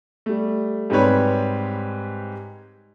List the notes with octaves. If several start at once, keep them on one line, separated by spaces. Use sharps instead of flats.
G3 A3
G#2 G3 C4 G4 B4 C#5